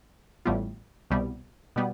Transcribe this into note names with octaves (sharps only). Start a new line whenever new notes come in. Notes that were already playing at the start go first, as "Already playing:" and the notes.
A1 A2 G3 B3 F4
C2 B2 G3 B3
B2 G3 B3